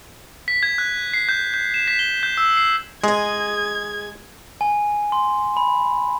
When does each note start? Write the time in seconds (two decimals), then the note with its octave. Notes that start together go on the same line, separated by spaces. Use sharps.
0.48 B6
0.63 G#6
0.78 F#6
1.14 C7
1.29 G6
1.54 G6
1.74 E7
1.88 B6
1.99 G7
2.23 G6
2.37 E6
2.57 C7
3.04 G#3 G#4 D#5 G#6
4.61 G#5
5.12 C6
5.57 B5